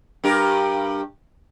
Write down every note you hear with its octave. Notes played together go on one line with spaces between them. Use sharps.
G2 G4 A#4